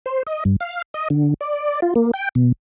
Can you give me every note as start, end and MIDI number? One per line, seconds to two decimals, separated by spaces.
0.06 0.23 72
0.27 0.44 75
0.45 0.56 43
0.60 0.82 77
0.94 1.08 75
1.10 1.34 50
1.41 1.80 74
1.82 1.94 65
1.96 2.11 58
2.14 2.29 79
2.35 2.52 47